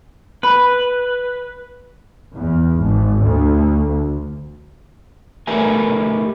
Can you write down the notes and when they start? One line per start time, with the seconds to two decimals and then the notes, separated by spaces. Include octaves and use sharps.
0.43 B4 B5
2.35 E2
2.78 G#1
3.21 D2
5.47 A3 G4 A#4 B4 E5 G#5